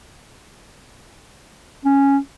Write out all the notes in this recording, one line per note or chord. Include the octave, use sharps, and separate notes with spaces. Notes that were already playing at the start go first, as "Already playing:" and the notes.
C#4